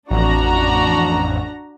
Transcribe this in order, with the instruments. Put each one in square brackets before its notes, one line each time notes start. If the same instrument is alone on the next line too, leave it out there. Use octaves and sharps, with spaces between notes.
[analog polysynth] A1 F2 [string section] D4 F#4 A#5